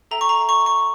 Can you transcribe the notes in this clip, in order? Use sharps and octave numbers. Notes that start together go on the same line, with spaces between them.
A4 E5 G5 A#5
C#6
A#5
C#6
C#6